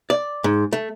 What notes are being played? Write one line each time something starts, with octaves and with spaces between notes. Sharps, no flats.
D5
G#2
A3